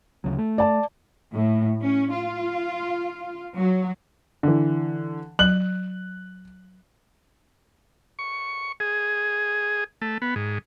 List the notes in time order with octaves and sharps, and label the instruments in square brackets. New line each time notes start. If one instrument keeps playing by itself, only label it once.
[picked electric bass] D2 C#3 F#3
A3
[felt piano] D5 A5
[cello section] A2
C#4
F4
F#3
[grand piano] D3 E3
[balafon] F#3 [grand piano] F#6 F#7
[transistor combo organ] C#6
G#4
A3
B3
G#2